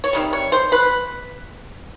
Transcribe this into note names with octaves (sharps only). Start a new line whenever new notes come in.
C#5
C3 D#3 G3
C#5
C5
B4